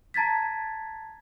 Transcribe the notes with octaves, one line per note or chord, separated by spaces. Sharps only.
A5 A#5 G#6 A6 B6